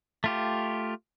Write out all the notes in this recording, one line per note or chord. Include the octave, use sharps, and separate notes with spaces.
A3 F4 G4